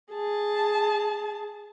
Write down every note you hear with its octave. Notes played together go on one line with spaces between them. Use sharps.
G#4 A5